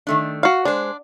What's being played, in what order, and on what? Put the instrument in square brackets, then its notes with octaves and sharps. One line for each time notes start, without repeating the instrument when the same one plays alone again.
[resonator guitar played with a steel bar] D#3 A3 D4
[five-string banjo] F#4 F5
[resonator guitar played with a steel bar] G#3 C5 [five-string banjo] D4